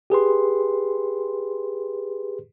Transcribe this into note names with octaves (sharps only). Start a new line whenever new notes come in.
G4 G#4 B4 C6